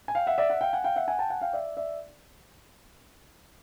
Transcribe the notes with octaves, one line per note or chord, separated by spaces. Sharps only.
G#5
F5 G5
E5 F#5
D5 E5
E5 F#5
F5 G5
F#5 G#5
F5 G5
E5 F#5
F#5 G#5
G5 A5
F#5 G#5
F5 G5
D5 E5
D5 E5